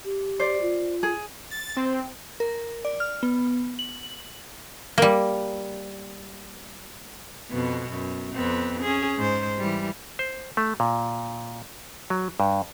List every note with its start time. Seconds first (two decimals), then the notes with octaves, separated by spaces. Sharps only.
0.04 G4
0.40 C5 D5
0.61 F4
1.03 G#4
1.51 A6
1.76 C4
2.40 A#4
2.85 D5
3.00 F6
3.23 B3
3.79 F#7
4.98 G3 A#3
7.50 F2 B2 B3
7.90 F#2
8.33 F2 B3 C4
8.81 C#4 G#4
9.17 G#2 C5
9.58 E3 G3
10.19 C5
10.57 A3
10.80 A#2
12.10 F#3
12.40 G2